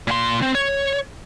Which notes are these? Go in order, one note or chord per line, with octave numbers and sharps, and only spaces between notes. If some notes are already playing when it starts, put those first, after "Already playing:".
A#2 C6
C4
C#5